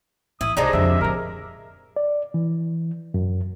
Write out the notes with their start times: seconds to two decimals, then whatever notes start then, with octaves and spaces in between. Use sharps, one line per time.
0.41 A1 E4 D#6
0.57 C2 C3 G#3 D4 D#4
0.73 F2 D3 E5
1.01 A2 C#3 A#4
1.96 D5
2.34 E3
3.14 F#2